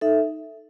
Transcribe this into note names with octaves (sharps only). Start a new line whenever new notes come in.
D#4 A4 E5